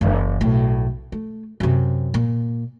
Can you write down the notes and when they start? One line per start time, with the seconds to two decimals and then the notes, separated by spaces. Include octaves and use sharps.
0.01 F#1 E3
0.41 B1 A2
1.12 A3
1.60 F#2 C3
2.14 A#2